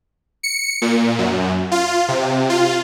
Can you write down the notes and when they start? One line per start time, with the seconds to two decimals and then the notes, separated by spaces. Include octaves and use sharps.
0.43 C#7
0.82 A#2
1.18 F#2
1.72 F4
2.08 C3
2.50 F4